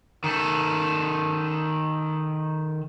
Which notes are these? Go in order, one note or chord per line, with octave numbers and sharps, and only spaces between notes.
D#3 A4